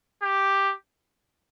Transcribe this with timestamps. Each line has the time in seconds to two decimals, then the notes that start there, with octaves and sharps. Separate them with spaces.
0.23 G4